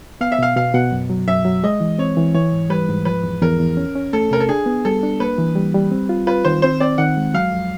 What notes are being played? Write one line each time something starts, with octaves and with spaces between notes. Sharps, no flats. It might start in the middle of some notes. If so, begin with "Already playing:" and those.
B3 F5
E5
B2 F5
B2 F5
B2 F#5
F#2
F#3
F#2 E5
F#3
G#3 D#5
E3
C4 C#5
E3
E3 C#5
G#2
G3 B4
G#2
F3 B4
E2
E2 A#4
E2
C#4
C#4
A3 A4
C3 A#4
A4
D4 G#4
B3
G3 A4
D4
A#3 B4
E3
G3
G3
C4
F4
F4 B4
D#3 C5
C4 C5
C4 D5
D#3 F#5
G#3
F#3 F5
F2